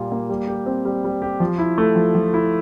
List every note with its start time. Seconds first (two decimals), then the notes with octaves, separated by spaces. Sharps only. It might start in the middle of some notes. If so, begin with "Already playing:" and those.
Already playing: A#2 G3 A#3 F4
0.12 A#3
0.29 G3
0.47 G4
0.66 C4
0.85 G3
1.04 G3
1.22 G4
1.40 F3
1.59 E4
1.78 A3
1.96 F3
2.15 F3
2.34 E4